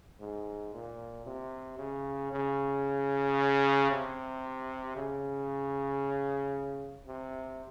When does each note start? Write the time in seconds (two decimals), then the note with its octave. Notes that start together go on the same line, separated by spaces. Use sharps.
0.20 G#2
0.74 A#2
1.26 C3
1.79 C#3
2.33 C#3
3.91 C3
4.96 C#3
7.07 C3